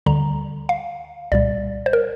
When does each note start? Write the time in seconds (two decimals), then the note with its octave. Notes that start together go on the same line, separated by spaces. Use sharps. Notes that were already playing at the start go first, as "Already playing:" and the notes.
0.06 D2 D3 G3 A#5
0.69 F5
1.32 C2 A#2 G3 D5
1.86 C5
1.93 A#4